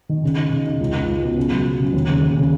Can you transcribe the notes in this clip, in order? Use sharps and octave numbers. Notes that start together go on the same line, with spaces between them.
D#3
C#3
D#4
C#3
D#4
C#2
C#2
C#2
B2
C#3
F#3
F#3
C#3
D#2
C#3
D#2
C#3